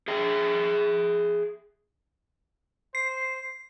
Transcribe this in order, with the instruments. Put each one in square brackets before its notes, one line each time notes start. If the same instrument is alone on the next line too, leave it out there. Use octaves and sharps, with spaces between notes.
[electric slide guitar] G#4 E5 G5
[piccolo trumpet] C5 [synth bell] C7